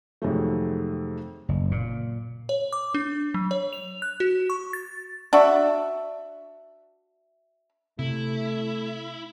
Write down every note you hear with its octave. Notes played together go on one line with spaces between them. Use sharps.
F2 C3 D#3 F#3 G#3 A3
F#1
A#2
C#5
D6
D4
F#3
C#5
F7
F#6
F#4
C#6
A6
D4 F#4 E5
C3 A3 E4